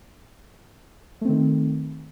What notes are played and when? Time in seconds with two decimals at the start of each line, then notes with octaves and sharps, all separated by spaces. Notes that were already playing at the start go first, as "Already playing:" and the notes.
1.21 A3
1.25 C4
1.29 D#3